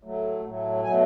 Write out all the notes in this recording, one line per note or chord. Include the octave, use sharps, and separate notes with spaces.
A2 F#3 A3
A2 F#3 A3
B2 F#3 A3 G#5